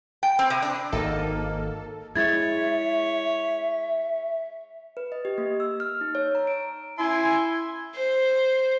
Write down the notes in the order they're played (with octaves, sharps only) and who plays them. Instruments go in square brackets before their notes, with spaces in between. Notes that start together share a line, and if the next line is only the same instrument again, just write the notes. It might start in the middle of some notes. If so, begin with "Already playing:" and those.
[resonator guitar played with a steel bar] G5
C4
C3
D4
[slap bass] G#1 [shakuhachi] A#3 [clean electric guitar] D#4 [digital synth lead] A4
[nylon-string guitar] G#3 E4 [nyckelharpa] C#5 [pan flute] E5 [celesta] G#6 A6
[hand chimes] B4
D#5
G4
A#3
E6
F6
D#4
C#5
A#5
D7
[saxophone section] E4 [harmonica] E5 C6 [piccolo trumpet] G#5
[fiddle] C5